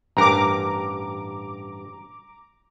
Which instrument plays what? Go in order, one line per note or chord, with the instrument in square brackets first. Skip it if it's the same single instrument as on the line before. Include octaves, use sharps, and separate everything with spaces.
[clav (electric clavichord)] A1 G2 A#4 [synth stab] A#5 D6